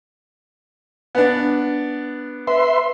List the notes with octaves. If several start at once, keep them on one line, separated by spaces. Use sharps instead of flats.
B3 D4
B4 E5 C6